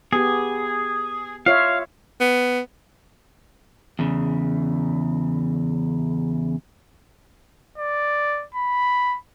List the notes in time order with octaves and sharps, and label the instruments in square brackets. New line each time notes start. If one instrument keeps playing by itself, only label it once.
[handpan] B3 G4 [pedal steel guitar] G#4
[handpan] F4 C#5 E5 [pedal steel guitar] F5
[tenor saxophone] B3
[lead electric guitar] E2 C#3
[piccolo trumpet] D5
B5